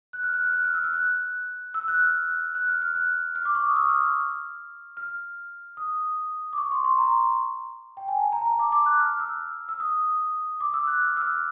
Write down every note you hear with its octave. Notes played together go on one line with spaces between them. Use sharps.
F#6
F6
F#6
F6
F#6
F6
E6
F6
F#6
E6
F#6
F6
F#6
F6
F6
F#6
F6
D6
C#6
D#6
E6
F6
F6
F6
D#6
D6
C#6
C6
C6
A#5
G5
G#5
A5
A#5
A5
D6
D6
F#6
F6
E6
E6
D#6
D6
E6
F#6
F6
E6
F6